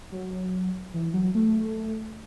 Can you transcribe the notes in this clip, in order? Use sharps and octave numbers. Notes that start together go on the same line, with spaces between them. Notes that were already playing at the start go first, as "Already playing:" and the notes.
F#3
E3
F#3
A3